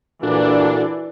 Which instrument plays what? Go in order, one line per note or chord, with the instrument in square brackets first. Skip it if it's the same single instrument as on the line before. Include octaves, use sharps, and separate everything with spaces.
[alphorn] A#2 [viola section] E3 D5 [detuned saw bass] D4 [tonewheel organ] F#4 A4